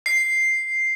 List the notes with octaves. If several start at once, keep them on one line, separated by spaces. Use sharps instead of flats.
C7